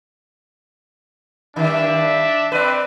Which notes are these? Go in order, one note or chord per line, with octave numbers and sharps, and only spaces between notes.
G2 D#3 D4 E5
C4 B4 D5